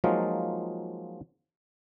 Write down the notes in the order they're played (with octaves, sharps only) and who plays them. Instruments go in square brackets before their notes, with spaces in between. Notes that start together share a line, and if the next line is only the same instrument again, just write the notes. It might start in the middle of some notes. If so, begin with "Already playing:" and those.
[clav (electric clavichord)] F3 F#3 G#3 A#3 D#4 F4